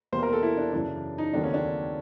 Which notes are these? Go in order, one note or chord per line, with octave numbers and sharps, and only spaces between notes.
E2 B2 G3 A#3 C5
A#4
A4
E4
D4
F#2 C#3 E3 D4
D#4
D#2 C#3 F#3 A3 C4 D4
C#4
D4